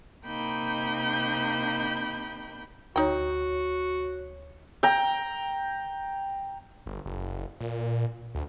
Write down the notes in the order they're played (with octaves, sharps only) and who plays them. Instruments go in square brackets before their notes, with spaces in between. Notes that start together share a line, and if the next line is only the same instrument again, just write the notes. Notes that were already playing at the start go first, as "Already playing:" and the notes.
[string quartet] C3 A#3 D#4 G5 B5 G6
[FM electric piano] D2 C#5 [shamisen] D#4 G5 [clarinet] F#4
[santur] G5 A#5
[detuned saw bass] G1
F#1
A#2
D2